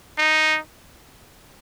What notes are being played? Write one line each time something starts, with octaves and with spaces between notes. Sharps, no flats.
D#4